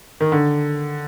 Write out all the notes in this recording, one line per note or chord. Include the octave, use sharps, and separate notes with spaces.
D#3
D3